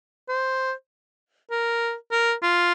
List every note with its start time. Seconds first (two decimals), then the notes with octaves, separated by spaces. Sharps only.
0.29 C5
1.51 A#4
2.12 A#4
2.43 F4